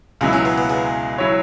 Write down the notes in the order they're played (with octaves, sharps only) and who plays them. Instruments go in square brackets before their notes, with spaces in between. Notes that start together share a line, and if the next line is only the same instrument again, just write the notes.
[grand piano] C#2 B2 F#3 E4 [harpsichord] G#3
[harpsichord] C#4
B3
B3
G#3
[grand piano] F#3 E4 C#5